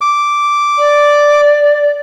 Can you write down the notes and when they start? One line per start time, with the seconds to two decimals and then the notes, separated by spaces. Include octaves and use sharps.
0.01 D6
0.78 D5